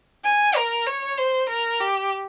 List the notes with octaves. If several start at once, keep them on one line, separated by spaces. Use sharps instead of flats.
G#5
A#4
C#5
C5
A#4
G4